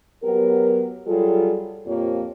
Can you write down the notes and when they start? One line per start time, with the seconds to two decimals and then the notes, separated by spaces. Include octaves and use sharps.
0.24 F#3 B3 G4 A#4
1.07 F#3 G3 F4 G#4 A4
1.86 F2 A#2 F3 A#3 G4 C#5